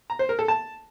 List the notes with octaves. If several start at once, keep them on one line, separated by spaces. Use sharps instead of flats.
A#5
C5
A#4
A4
A5